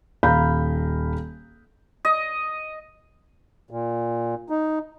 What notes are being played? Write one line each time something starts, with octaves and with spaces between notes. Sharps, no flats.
D#1 F5 A#5 B5 G6
D#5
A#2
D#4